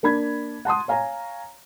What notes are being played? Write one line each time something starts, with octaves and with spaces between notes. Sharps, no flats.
A#3 D4 B5 G#6
F#5 A5 C6 D#6
C#5 F5 G#5 A#5